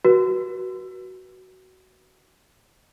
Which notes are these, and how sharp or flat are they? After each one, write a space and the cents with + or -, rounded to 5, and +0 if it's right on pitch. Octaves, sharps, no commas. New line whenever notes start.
F#4 +15 B4 -35